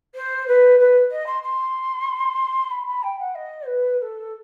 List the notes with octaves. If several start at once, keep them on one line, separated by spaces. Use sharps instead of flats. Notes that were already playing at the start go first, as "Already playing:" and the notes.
C5
B4
B4
D#5
C6
C6
B5
B5
G5
F#5
D#5
B4
B4
A4